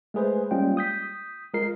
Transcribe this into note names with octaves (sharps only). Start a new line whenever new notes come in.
G#3 A3 G#4 B4 C5
G3 G#3 A#3 C#4 F4 G5
D#6 G6 B6
G#3 F4 A#4 C7